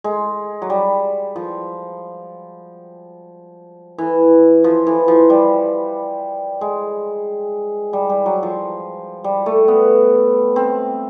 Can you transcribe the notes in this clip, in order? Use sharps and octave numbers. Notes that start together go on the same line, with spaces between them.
G#3
F#3
G3
F3
E3
F3
E3
F3
G3
G#3
G3
G3
F#3
F3
G3
A3
B3
C4